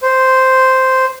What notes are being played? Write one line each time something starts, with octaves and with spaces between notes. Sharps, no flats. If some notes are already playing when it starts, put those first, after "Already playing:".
C5